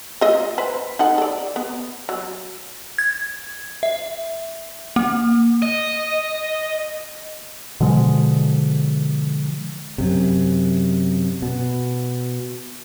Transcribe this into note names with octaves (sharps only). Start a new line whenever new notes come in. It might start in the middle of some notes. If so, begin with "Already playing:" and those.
A3 F4 D#5
B4 C5
D#4 A4 F#5
A4 D5
B3
F#3
G#6
E5
A#3
D#5
B2 D3 F3 G#3
F#2 C3
B2